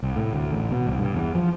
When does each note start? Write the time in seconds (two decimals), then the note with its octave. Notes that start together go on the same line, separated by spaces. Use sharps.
0.03 C2
0.16 A2
0.33 D2
0.51 A1
0.71 B2
0.87 C2
0.99 G2
1.14 E2
1.35 F3